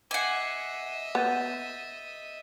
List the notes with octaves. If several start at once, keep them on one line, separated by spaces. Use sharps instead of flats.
D#5 E5 F#5 G#5 D6 C7
B3 G6 A6